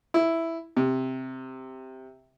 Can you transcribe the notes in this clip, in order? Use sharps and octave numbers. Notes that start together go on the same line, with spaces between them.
E4
C3